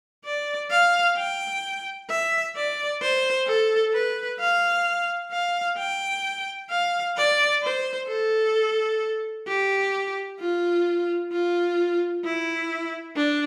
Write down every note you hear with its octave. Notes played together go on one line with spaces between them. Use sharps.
D5
F5
G5
E5
D5
C5
A4
B4
F5
F5
G5
F5
D5
C5
A4
G4
F4
F4
E4
D4